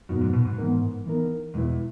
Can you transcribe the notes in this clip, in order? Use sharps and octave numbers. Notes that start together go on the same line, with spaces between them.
F#2 A#2 F#3 B3 D#4 F#4
G#2
B2
G#2
E3 B3 D#4 A#4
E3 B3 D#4 A#4
E2 B2 G#3 B3 E4 B4